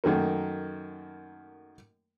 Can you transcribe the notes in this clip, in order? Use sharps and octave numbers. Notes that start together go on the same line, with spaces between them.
F#2 D#3 A3 A#3